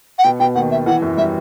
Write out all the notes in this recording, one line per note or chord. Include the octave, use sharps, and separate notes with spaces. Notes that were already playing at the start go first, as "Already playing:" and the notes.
F#5
B2 G5
B2 G5
D#2 D#3 F#5
E5
E2 E3 F#5
F#2 F#3
G3 E5